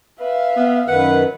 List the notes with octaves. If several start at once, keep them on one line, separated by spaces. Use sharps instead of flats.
B4 E5 F5
B3
F#2 D#3 B4 F#5